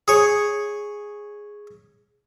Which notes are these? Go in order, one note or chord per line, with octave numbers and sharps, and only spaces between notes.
G#4 C#5